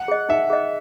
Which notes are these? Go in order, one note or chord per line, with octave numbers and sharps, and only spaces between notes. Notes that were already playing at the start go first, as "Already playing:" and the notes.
Already playing: F#5
G#4 D#5
D#4 E5
G#4 D#5